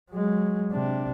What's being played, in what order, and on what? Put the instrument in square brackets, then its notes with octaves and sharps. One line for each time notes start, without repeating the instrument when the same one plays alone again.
[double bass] F#3 G#3
C3 D4